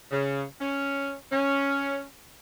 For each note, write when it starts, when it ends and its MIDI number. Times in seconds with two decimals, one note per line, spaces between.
0.11 0.43 49
0.61 1.13 61
1.31 2.01 61